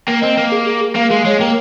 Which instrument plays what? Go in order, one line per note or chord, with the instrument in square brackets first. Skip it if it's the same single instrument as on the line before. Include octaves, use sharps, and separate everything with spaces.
[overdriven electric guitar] A#3 [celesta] G5
[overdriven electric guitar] C4 [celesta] D#5
[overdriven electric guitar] A#3 [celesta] G5
[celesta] G#4
G#4
G#4
[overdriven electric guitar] A#3 [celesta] F5
[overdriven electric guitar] G#3 [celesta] G#4
[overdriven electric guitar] G#3 [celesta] C#5
[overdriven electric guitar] A#3 [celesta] G5